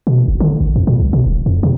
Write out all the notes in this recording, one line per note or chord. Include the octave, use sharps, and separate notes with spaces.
B2
F#1
D3
G#1
F2
A#2
C2
B2
D#1
F2
C3